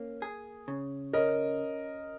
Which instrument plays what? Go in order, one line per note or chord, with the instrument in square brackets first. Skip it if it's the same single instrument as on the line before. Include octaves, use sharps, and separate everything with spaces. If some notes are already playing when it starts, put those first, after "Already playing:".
Already playing: [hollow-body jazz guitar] A#3 C#4
G#4
C#3
[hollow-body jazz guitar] C#4 [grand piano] A#4 D#5